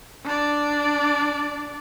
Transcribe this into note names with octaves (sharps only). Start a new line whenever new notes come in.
D4 D5